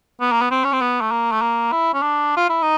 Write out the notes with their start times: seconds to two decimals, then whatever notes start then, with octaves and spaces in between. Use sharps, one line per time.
0.21 B3
0.32 A#3
0.42 B3
0.51 C4
0.65 C#4
0.73 C4
0.82 B3
1.01 A3
1.11 A#3
1.32 A3
1.42 A#3
1.72 E4
1.94 C#4
2.02 D4
2.37 F4
2.50 E4
2.62 D#4